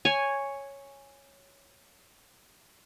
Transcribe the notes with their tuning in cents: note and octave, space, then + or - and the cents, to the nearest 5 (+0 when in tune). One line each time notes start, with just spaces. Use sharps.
C#5 +0 G#5 -5